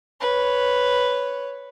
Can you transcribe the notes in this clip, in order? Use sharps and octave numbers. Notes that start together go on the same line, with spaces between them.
B4 C#5